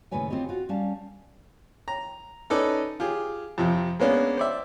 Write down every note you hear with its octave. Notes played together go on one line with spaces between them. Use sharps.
D#2 A2 C#3 B4 C#5 G#5
C4 F4 G4 C#5 D#5
F4 F#4
G3 C#4 F5 A5
A#5
C#4 D#4 A4 B4 D5
F4 G4 G#4
F2 C3 F3
G#3 A#3 B3 C#4 D4
C5 D5 E5